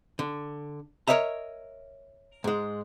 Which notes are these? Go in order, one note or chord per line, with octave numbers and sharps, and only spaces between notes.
D3
A#4 C#5 D#5 E5 A#5
G#2 G#3